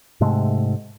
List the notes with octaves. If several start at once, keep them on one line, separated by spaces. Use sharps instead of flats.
G#2 C3 G#3 A3